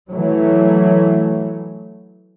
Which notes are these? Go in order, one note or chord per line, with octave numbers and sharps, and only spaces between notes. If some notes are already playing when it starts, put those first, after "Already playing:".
E3 F#3 A3